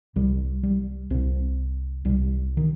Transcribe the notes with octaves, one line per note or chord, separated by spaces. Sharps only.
C2 C3 G3
G3
C2 C3 C4
C2 C3 G3
D#3